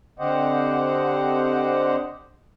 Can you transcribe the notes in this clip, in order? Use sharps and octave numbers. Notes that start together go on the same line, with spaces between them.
D3 C4 G4 C5 D#5 F#5